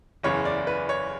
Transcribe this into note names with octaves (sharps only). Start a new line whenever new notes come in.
F#1 E2 C#3 C#5
D5
B4
C#5